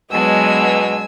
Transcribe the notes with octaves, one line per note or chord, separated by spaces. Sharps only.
B2 F#3 G#3 B3 D4 G#5 E6